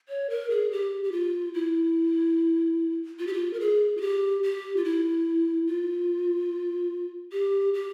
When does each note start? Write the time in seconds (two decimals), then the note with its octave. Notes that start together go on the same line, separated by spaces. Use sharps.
0.09 C#5
0.30 A#4
0.50 G#4
0.72 G4
1.04 G4
1.12 F4
1.54 E4
3.19 F4
3.27 G4
3.34 F4
3.53 A#4
3.60 G#4
3.97 F4
4.01 G4
4.43 G4
4.77 F4
4.84 E4
5.67 F4
7.32 G4
7.74 G4